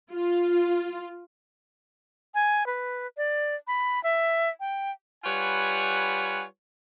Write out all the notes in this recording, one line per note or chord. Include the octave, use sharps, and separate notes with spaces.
F4
G#5
B4
D5
B5
E5
G5
G3 F4 B4 C#5 F#5 G#5